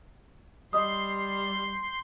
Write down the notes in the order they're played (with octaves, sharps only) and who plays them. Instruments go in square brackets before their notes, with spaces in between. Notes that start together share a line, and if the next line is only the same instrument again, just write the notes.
[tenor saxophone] G3 [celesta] D#5 D#6 [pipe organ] C6 G6